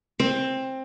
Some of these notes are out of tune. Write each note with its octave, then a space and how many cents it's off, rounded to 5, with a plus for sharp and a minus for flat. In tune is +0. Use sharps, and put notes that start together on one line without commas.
C4 +15